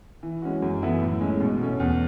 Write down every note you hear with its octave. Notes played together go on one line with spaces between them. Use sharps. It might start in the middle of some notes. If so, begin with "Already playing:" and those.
E3
G#3 C#4 F#4
F#2
E3 B3 E4 A4
A2
G#3 C#4
B2
A3 C#4
E2